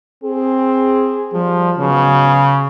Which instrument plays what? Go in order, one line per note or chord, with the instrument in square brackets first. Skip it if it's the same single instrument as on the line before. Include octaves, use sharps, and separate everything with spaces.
[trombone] C4 [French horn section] G#4
[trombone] F3 [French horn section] G3
[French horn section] G#2 F#3 B3 [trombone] C#3